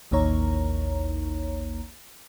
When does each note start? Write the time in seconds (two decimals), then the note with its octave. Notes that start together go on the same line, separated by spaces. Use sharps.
0.11 A1 D#2 A#3 D#4 C#5 A#5